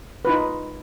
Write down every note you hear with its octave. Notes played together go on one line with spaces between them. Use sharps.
D#4 F4 B4